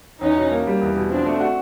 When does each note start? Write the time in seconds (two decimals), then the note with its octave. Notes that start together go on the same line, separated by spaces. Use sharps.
0.21 E2 C#4 D#4
0.36 B2
0.52 A#3
0.67 G3
0.82 E2
0.96 B2
1.11 F3 C4 D4
1.26 A3
1.40 F#4